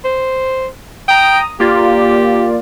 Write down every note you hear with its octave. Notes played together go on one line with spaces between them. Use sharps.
C5
G5 A#5 D#6
A#3 F4 G4 D5